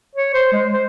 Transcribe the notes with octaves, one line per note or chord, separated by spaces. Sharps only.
C#5
C5
G#3
C5